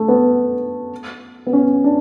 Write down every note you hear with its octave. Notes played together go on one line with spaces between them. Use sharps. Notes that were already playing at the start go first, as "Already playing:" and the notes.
Already playing: A3
B3
B3
C#4
D4